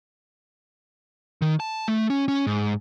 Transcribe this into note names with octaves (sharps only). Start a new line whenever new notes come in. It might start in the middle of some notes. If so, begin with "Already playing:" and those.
D#3
A5
A3
C#4
C#4
G#2